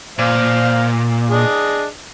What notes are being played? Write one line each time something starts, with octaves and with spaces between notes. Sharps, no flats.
A#2 C5 F5
D4 G#4 D#5